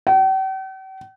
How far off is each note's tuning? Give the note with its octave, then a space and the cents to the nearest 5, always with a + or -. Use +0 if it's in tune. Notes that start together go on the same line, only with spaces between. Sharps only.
G5 -45